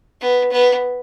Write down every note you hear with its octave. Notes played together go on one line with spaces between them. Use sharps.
B3
B3